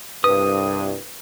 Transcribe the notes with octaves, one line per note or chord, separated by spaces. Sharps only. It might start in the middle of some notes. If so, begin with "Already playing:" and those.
C2 G2 B4 D#6